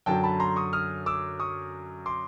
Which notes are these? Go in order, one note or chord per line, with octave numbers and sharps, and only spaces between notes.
F#2 D3 F#3 G5 A5
A5 B5
A#5 C6
C#6 D#6
D#6 F6
D6 E6
C#6 D#6
C6 D6